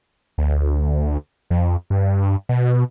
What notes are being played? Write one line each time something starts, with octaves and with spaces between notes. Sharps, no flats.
D2
F2
G2
B2